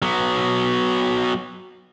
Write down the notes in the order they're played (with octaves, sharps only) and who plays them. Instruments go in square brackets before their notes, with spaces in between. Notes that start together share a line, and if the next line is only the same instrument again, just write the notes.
[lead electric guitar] F#3 B3